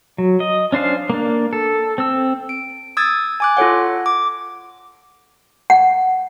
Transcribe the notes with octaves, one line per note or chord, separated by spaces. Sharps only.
F#3
D#5
C#4 D4 C5 F5
A#3 D4
A4
C4 E6
D7
D#6 E6 G#6 A6
G#5 D6 F#6
F4 A4 C#5 F#5
D6
F#5